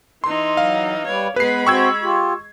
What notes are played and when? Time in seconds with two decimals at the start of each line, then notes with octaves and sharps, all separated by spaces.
0.24 E3 D#4 C6
0.57 F#3 F5
1.06 G3 B4 C#5 D5
1.36 G#3 B3 B4 B5 C7
1.67 C4 F#4 G5 C#6 E6 G#6
2.03 F4 G4